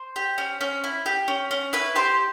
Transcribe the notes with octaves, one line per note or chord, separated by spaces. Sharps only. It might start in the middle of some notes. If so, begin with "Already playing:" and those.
Already playing: C5 C6
G4
C#4
C#4
E4
G4
C#4
C#4
E4 B4 B5
G4 C5 C6